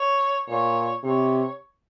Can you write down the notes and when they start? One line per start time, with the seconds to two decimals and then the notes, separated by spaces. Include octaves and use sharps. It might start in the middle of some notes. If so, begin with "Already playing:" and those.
Already playing: C#5
0.49 A#2 C#5
1.04 C3 C#5